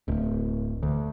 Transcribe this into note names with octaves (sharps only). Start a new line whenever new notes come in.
D1
D2